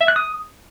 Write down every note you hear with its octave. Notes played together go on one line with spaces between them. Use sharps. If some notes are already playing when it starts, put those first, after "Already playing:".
E5
F#6
D#6